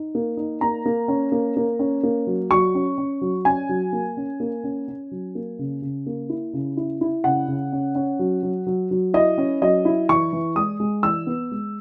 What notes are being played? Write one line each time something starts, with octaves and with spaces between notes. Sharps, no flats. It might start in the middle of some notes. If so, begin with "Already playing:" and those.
Already playing: D#4
A#3
D#4
A#3 A#5
A#3
C#4
A#3
A#3
C#4
A#3
F#3
F#3 C#6
C#4
C#4
F#3
C#4 G#5
F#3
A#3
C#4
A#3
C#4
C#4
F#3
A#3
C#3
C#3
A#3
E4
C#3
E4
E4
C#3 F#5
C#3
C#4
C#4
F#3
F#3
F#3
F#3
E4 D#5
C#4
F#3 D#5
E4
E3 C#6
E3
G#3 D#6
G#3
E3 E6
B3
G#3